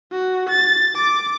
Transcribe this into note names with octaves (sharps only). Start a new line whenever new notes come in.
F#4
A6
D6